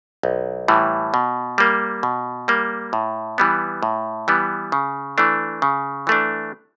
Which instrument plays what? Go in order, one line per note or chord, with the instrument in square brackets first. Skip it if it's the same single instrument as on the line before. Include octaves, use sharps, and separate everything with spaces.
[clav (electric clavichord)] B1
A2 E3 G3
B2
G3 A#3
B2
G3 A#3
A2
E3 G3 B3
A2
E3 G3 B3
C#3
E3 A3 D4
C#3
E3 A3 D4